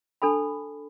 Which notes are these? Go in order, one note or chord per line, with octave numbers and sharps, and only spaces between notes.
D4 A4 A5 B5